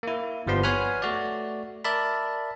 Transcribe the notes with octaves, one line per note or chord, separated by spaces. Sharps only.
A#3 E4
G1 F3 G3 B3 C6
B4 C#5 F#5 G#5 B5 F6
A3 F#4 D5
A#4 D5 E5 A5 B5